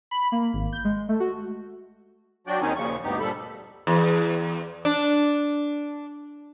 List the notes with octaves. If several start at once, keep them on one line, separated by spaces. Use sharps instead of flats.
B5
A#3
G#1
G6
G#3
A3
F#4
F#3 D4 F#4 D5 G5
D#2 D#3 C4 C#4 D#4 G#5
D#2 A#2 C#3 F3 C#6
D2 G2 B3 D#4 G4
A#2 F3 G3 A4 B5
E2
D4